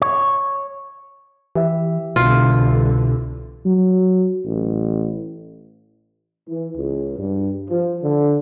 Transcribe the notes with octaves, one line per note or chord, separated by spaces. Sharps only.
C#5
E3 G4 E5
C2 B2 D3 E3 F4
F#3
A1
E3
C#2
G2
F3
D3